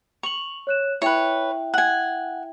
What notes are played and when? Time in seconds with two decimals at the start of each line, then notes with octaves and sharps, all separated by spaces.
0.23 C#6 F7 F#7
0.67 C#5 F#6 E7
1.02 E4 B4 C#5 E5 G5
1.74 F#5 G#5